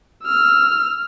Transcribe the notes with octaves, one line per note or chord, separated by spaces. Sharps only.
E6 F6